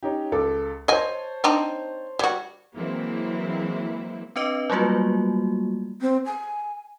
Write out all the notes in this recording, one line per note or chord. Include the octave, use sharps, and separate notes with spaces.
C#4 D#4 G4
C#2 A4 D6
C5 C#5 D#5 G#5 A5
C4 D4 D#4
G3 F#4 G#6
E3 F#3 G#3 A#3 C4 E4
C4 D4 B4 D#5 D6
F#3 G3 A3 A#3 F4 F#4
C4
G#5